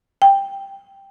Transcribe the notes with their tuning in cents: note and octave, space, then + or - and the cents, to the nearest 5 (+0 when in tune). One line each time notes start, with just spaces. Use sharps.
G5 +10